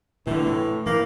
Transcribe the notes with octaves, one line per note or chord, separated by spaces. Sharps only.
A2 D3 E3
A2
G#2 E3 A#3